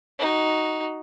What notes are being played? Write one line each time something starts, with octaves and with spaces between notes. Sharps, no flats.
D#4 F#4